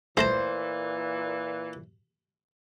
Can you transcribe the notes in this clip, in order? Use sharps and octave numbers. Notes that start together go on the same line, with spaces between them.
A#2 E3 A3 A#4 C5 A5